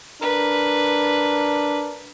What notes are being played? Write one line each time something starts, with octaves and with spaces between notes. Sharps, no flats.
D4 A#4 B4